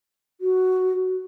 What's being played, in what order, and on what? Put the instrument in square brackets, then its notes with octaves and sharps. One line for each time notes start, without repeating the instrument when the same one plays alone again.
[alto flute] F#4